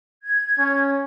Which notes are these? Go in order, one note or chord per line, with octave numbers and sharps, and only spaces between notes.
G#6
C#4